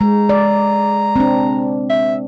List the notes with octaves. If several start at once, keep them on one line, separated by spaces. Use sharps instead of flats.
G#3 A#5
D5
C4 D4
E5